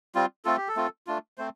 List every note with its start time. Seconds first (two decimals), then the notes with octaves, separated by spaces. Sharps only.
0.15 G3 C4 F4
0.45 A3 C4 F4 A4
0.57 G4
0.68 A4
0.76 A3 C4 F4
1.07 A3 D4 F4
1.38 A3 C4 C5